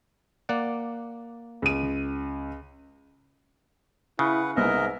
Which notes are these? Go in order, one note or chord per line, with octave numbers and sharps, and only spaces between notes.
A#3 D5 F#5
C#2 D#7
C#3 E4 B4 F#5
C2 G#2 B3 A#4 D#5 E5